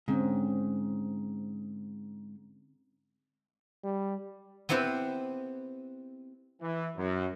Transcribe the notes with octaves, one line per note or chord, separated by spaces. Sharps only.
G#2 D3 C4 C#4
G3
B3 C4 E4 G4 B4 C5
E3
F#2